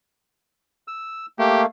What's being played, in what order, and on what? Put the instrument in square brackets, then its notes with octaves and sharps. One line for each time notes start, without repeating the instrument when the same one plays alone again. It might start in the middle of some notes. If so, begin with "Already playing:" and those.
[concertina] E6
[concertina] A3 A#3 [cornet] G4